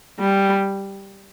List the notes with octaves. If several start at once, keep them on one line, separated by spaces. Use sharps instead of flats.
G3